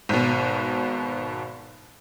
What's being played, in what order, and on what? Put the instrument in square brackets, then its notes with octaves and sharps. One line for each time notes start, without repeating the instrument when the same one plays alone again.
[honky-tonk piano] G#1 B2